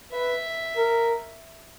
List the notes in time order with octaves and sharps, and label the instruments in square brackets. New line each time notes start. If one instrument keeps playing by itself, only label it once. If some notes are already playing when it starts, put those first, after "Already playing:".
[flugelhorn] B4 [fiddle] E5
[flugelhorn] A#4